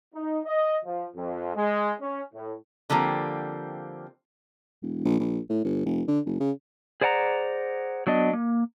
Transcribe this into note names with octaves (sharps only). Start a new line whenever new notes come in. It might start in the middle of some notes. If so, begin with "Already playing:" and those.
D#4
D#5
F3
F2
G#3
C#4
A2
D3 F3 G3 A#3 C4
E1
A#1
A#1
A2
G1
F1
D3
F#1
C#3
G#4 C5 D5 F#5 A5 A#5
F#3 B3 D4 D#5
A#3